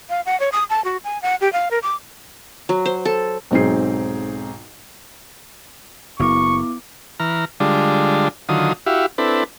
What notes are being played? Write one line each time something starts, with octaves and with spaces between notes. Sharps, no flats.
F5
F#5
C#5
D#6
A5
F#4
G#5
F#5
G4
F5
A#4
D6
F#3
C5
A4
B1 G#2 C4 D#4 G#4 C7
F#1 B3 E4 C#6 D6
E3 A#5 F6
D3 G3 G#3 D4 F4
D3 D#3 F#3 F4 D#6
E4 F#4 G4 E5 F5
C4 D4 E4 A4 B4